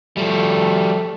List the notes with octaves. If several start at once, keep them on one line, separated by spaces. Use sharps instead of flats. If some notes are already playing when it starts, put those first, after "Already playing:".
F3 G3 A3